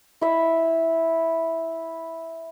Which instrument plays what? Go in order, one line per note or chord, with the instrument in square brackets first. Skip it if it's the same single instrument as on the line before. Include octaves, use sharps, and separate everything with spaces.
[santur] E4 E5